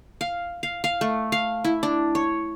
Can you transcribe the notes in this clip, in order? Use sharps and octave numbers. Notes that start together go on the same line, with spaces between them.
F5
F5
F5
A3
F5
E4
D4
C#5